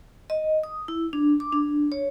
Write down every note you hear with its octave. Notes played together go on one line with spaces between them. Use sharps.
D#5
D#6
E4
D4
D6
D4
C#5